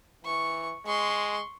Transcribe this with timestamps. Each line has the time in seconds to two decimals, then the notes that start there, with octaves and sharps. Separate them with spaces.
0.25 E3 C#6
0.86 G#3 C6 C#6